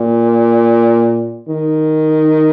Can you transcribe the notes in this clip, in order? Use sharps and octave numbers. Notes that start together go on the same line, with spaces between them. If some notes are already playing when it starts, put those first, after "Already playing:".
Already playing: A#2
D#3